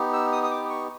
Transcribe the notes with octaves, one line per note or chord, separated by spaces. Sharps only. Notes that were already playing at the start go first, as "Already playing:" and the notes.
Already playing: B3 D#4 G4
E6
D#6
D#6
D6
C#6